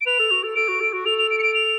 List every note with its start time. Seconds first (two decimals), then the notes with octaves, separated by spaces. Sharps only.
0.01 D7
0.06 B4 F7
0.19 A4
0.31 F#4
0.44 A4
0.55 A4 D7
0.68 F#4
0.80 A4
0.93 F#4
1.06 A4 F7
1.18 F7
1.30 D7
1.39 C#7
1.43 D7
1.54 F7